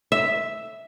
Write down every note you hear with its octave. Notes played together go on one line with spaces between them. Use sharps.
E5